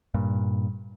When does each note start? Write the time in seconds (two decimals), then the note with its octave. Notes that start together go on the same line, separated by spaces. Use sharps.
0.14 G2 A#2